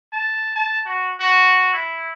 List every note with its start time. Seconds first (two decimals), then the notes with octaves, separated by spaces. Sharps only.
0.13 A5
0.56 A5
0.86 F#4
1.20 F#4
1.73 E4